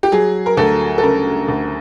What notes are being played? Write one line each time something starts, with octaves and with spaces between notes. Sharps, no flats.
G4
F#3 G#4
A#4
D2 A4
A4
C#3 A#4
D2